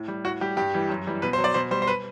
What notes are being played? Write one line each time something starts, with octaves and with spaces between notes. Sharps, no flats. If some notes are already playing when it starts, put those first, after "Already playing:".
Already playing: A2
G3
A2 F#4
G3 G4
G2 G4
E3 G3
F#2
E3 G3
B2 B4
C5
F#3
D5
B2 C5
G3 C5
C5
B4